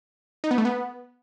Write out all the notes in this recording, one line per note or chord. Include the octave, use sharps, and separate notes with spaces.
D#4
B3
A3
B3